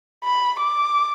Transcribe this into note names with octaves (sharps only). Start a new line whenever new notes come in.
B5
D6